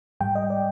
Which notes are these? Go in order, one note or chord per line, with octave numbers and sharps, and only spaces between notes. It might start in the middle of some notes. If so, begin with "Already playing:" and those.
G#2 G3 G5
D#5
D5